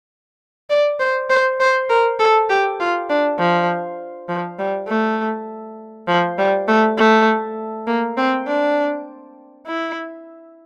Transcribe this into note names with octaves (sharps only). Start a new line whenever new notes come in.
D5
C5
C5
C5
A#4
A4
G4
F4
D4
F3
F3
G3
A3
F3
G3
A3
A3
A#3
C4
D4
E4